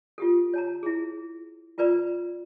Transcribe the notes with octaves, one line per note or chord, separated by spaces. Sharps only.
F4 G4 A4
C#5 A5 A#5
E4 G#4
F4 A#4 B4 D5 A#5